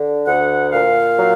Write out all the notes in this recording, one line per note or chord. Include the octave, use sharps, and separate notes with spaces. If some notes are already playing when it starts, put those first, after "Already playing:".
Already playing: D3
D2 F#5
A#2 F5
F#3